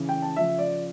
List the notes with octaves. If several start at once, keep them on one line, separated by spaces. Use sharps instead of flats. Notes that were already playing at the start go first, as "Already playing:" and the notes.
Already playing: C#3 E3
G5
A5
C#3 F3 E5
D5